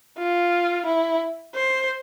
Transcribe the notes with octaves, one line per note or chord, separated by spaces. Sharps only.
F4
E4
C5